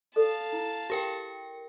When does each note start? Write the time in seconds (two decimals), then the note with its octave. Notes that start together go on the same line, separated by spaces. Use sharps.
0.16 A4 D5 F5 A5
0.53 E4
0.90 G4 A#4 G5